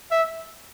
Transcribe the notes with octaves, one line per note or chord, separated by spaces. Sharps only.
E5